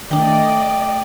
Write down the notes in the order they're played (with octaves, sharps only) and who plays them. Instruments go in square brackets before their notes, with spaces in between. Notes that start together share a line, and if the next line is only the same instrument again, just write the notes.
[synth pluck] D#3 D4 [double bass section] A3 [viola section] D5 D#5 [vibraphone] G5